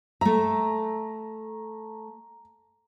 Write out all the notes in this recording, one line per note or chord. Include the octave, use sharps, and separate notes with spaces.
A3 E5 A#5